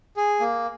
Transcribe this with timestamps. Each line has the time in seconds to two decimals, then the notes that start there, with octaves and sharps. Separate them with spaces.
0.17 G#4
0.40 A#3